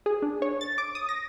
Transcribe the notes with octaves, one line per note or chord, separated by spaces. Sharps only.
G#4
D4
C#5
A6
D6
D#6
A#6